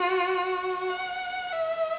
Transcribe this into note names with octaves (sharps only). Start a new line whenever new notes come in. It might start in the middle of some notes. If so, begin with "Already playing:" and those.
Already playing: F#4
F#5
E5